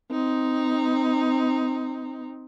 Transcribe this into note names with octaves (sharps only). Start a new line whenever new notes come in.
C4 D#4